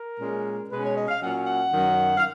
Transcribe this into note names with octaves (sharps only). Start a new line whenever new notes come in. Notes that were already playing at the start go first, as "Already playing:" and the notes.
Already playing: A#4
A#2 G#3 C#4
B2 G#3 C#4 B4
C#5
D#5
F5
A#2 F#3 C#4 F#5
F#5
F#2 D#3 F#3
F5